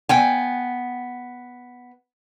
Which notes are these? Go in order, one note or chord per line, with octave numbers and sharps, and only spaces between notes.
B3 G5 G#5